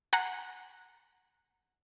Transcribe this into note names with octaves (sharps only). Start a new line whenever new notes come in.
F#5 G#5 A#5 C7